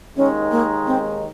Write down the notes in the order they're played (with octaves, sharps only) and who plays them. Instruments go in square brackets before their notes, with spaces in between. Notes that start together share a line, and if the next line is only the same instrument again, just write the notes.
[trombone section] D#2 D#3 G#3 D#4 [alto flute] C#4
[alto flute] A#3
C4